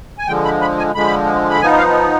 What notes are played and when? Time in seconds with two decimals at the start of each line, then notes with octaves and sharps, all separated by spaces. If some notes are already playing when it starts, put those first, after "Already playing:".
0.18 G#5
0.27 D3 F3 G#3 G5
0.45 B5
0.61 B5
0.78 G#5
0.95 D3 F3 G#3 B5
1.50 B5
1.61 F3 B3 D#4 G#5
1.78 F5